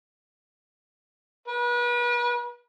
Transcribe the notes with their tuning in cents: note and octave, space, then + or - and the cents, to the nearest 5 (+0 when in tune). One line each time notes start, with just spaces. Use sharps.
B4 -35